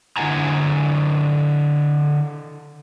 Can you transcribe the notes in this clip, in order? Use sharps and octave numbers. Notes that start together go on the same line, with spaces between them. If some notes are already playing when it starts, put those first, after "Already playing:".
D3 D4 E4 F#5 G#5 A#5